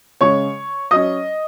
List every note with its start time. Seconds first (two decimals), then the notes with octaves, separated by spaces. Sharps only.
0.21 C#3 G#3 C#4 C#5 C#6
0.91 F#3 C#4 D#5 D#6